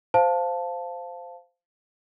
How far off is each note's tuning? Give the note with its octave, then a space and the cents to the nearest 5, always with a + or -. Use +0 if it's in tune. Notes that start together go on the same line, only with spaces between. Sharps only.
C5 -10 F5 +0 A5 +0